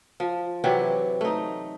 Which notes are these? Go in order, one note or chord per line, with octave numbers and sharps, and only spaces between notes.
F3
C3 E3 F#3 G4
A3 D#4